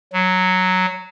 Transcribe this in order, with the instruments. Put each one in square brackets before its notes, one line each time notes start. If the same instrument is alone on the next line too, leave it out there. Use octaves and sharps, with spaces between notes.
[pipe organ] F#3